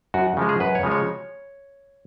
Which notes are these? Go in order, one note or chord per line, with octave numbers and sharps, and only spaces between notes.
F#2 F#4
C#3 F3 G#3
G#4
F#2 B4
C#5
C#3 F3 G#3
C#5